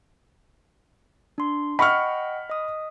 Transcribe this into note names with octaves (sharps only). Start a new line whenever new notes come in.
D4 C6
D#5 F#5 G5 B5 C#6 F6
D#5 D#6